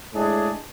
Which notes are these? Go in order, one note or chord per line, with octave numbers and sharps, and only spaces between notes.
A2 G#3 D4 G#4